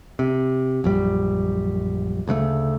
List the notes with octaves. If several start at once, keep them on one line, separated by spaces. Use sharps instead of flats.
C3
A#1 F#2 G3
D2 C#3 G#3 A3